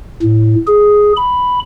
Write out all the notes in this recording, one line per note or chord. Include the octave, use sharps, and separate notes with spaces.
A2
G#4
B5